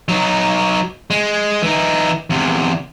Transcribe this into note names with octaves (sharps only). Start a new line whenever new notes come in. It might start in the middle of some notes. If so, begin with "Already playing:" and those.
F#3 D#4
G#3
E3 D#4
E2 C3